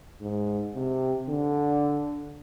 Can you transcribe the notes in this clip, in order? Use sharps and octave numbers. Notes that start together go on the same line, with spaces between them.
G#2
C3
D3